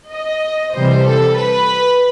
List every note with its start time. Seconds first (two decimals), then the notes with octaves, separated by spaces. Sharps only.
0.10 D#5
0.74 C3 E3 G3 C5
1.05 A4
1.37 B4